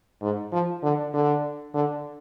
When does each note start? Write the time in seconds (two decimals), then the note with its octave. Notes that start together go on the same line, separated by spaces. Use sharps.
0.22 G#2
0.52 F3
0.83 D3
1.13 D3
1.74 D3